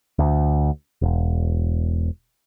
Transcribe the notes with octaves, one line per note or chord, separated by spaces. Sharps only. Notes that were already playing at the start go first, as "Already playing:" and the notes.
D2
E1